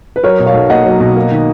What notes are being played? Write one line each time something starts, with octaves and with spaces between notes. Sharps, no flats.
B4
F#3 A#4 C#5
B2
C#5 F5
B1
A#3 D#5 F#5
F#3
B2
A#3
D#3